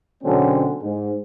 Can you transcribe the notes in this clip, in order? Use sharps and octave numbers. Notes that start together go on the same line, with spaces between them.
B2 D3 F#3 G#3 C4 C#4
G#2